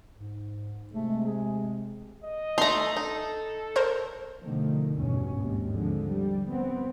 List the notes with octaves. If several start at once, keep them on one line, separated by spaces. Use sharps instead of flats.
G#2
C3 G#3 A3
G#4
D#5
A3 D#4 A#5 C6
D#4 A4
A#4 C5
B2 D3 D#3 F3 A3
A1 E2 G2 B2 C#4
G#1 D#2
D3 F3 G#3
G3
B3 C4